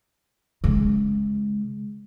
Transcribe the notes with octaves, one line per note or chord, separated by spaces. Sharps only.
C#3 G#3